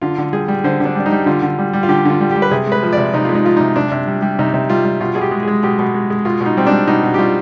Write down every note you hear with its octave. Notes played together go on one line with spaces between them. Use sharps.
D3 F4
D3
G3 G#4
G3
D3 C5
D3 D4
G3 D4
D#4
G3
D3 F4
D3
G3
G3
F4
D3 G4
D3 F4
G3
G3 G4
B4
C3 G#4
G#3
B4
F3
C3 D5
C3 D#4
G#3 F4
D#4
F3 F4
C3 D#4
C3 D4
C3
G3
G3
C3 D#4
C3
G3 F4
G3
B2 F4
B2 G#4
G4
G#3
G#3 G#4
B2 G4
B2
G#3
G#3
B2 F4
B2
D#4
G3 C4
D4
G3
B2 D#4
B2
G4
G3 F4